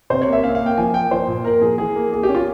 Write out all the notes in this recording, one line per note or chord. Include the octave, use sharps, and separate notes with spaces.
C3 C5
C#5
A#3
E5
C#4 F5
F5
A#3
G5
F3 G#5
A#3 G5
F3 C5
A#2
A#2 A#4
F3 G#4
E3 G#4
A#3
A#3 G#4
G4
C#4
F4